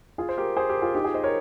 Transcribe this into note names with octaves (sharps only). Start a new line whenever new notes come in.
F4 G#4
C5
G4 A#4
G#4 C5
G4 A#4
F4 G#4
D#4 G4
F4 G#4
C5 D#5
A#4 C#5